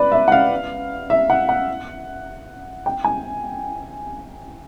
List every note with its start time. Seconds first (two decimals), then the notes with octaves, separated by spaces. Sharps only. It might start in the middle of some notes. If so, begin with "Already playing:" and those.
Already playing: B4 D5
0.12 E5
0.28 F#5
0.32 F5
1.10 E5
1.30 F#5
1.49 F#5
2.86 G5
3.04 G#5